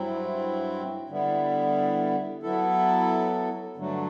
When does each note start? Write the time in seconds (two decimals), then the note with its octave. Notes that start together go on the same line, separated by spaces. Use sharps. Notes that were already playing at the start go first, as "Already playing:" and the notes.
Already playing: G2 F#3 C4 E4
1.09 D3 G3 B3 E4
2.43 F#3 B3 E4 A4
3.76 G2 D3 F#3 A3